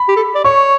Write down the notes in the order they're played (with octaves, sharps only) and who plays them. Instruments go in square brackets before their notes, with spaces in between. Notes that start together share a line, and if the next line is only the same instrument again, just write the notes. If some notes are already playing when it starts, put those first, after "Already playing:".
Already playing: [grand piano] B5
[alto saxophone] G4
A4
D5
[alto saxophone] C#5 [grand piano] C#6